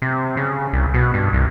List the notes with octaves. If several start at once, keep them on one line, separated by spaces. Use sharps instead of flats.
C3
C#3
C2
B2
G2
C2